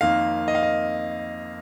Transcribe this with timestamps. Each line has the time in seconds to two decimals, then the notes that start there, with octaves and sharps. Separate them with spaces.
0.01 F2 D#3 A#3 F5
0.48 D#5
0.55 F5
0.63 D#5